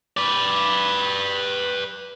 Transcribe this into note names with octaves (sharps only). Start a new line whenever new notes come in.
B4 D5